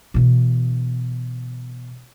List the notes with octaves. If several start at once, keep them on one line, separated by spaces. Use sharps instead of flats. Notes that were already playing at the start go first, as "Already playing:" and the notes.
B2 E3